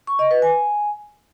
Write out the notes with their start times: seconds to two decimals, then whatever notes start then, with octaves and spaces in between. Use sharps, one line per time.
0.07 C#6
0.19 D#5
0.31 B4
0.42 G#5